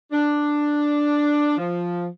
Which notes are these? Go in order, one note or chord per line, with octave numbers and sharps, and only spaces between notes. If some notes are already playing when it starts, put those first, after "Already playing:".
D4
F3